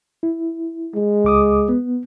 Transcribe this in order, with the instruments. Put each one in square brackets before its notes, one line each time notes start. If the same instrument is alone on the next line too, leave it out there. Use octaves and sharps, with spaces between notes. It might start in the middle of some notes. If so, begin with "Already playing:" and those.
[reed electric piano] E4
[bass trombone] G#3
[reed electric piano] C#2 D6 D#6
B3